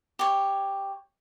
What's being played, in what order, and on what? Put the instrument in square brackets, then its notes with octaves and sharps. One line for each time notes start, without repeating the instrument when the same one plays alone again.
[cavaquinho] G4 C#5